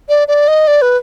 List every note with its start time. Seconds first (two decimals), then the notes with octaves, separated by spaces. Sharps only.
0.09 D5
0.28 D5
0.48 D#5
0.67 D5
0.82 B4